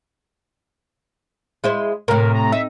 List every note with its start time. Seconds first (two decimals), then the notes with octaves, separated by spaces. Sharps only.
1.64 G#3 E4 C5
2.08 A2 C3 A#4
2.34 A#5
2.52 D#4 E5